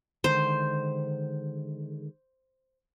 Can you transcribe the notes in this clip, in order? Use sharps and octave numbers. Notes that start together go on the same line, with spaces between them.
D3 D#3 G#3 C5